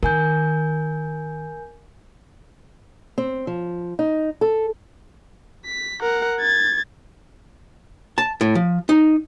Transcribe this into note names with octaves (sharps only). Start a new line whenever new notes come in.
D#3 A#4 G#5 G6
C4
F3
D#4
A4
B6
A#4 F#5
G#6 A6
A5
A2
F3
D#4